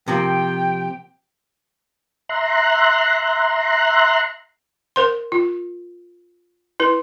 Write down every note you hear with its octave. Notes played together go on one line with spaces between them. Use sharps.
C3 F3 A#3 G5
E5 A#5 C6 F#6
A#4 C5 C6
F4
E4 B4